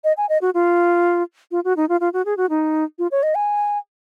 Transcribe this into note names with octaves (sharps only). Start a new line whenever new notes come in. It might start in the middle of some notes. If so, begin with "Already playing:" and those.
D#5
G#5
D#5
F#4
F4
F4
F#4
D#4
F4
F4
F#4
G#4
F#4
D#4
F4
C#5
D#5
G#5